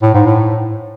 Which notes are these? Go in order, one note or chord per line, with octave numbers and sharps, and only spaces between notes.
A2
G#2
A2